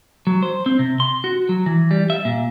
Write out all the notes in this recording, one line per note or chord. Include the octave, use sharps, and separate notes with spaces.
F#3
C5
C4
C3
C6
F#4
F#3
E3
G3
E5
A#2